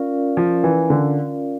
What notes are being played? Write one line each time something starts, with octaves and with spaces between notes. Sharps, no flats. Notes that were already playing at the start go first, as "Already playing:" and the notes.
Already playing: C#4 F4 A#4 D5 F5
F3
E3
D3